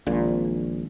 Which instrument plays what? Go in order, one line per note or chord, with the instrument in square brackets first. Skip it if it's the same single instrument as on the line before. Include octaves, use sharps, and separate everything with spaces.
[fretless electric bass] A#1 A#2 [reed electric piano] F#2 D#3 G#3 C4